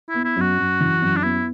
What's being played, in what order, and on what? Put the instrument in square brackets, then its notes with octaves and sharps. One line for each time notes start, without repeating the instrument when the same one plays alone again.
[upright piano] B3 [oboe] E4
[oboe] E4
[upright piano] F#2 [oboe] F#4
[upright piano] F#2
E3
F#2
[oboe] D4
[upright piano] B3 [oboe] E4